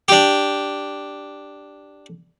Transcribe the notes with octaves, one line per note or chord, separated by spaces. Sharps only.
D4 G4